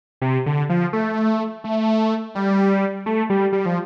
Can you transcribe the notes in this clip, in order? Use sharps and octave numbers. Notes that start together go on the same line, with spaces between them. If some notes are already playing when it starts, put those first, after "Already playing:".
C3
D3
F3
A3
A3
G3
A3
G3
G3
F3